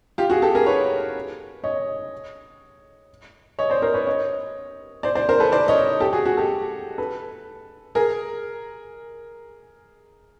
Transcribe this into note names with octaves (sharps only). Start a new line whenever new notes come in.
F4 G4
F#4 G#4
G4 A4
G#4 A#4
B4 C#5
C#5 D#5
C#5 D#5
C5 D5
A#4 C5
B4 C#5
C#5 D#5
C5 D5
C5 D5
A#4 C5
A4 B4
C5 D5
C#5 D#5
G4 A4
F#4 G#4
F#4 G#4
G4 A4
A4 B4
G#4 A#4